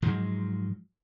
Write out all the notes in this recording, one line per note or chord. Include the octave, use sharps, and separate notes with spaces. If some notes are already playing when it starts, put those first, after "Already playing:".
G#2 F3 F#3 G#3